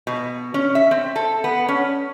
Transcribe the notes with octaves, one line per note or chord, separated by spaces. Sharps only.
B2
C#4
E5
C4
A4
B3
C#4